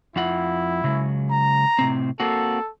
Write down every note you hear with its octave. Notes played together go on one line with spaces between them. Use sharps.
F2 E4 F4 F#5
C#3 F#3 G#3
A#5
A2 C3 C4
A#3 C4 F#4 A4